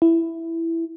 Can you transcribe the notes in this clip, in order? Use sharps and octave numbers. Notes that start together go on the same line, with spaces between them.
E4